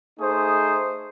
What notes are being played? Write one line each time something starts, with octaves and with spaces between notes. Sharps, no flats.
A3 D#4 G#4 C5 D#6